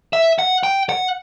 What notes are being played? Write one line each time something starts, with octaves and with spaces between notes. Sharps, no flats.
E5
F#5
G5
F#5